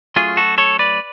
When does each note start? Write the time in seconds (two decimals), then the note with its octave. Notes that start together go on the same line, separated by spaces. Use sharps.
0.16 F#3 A3 C#4 F4 G#4
0.37 F#4 A4
0.58 A4 C#5
0.79 B4 D5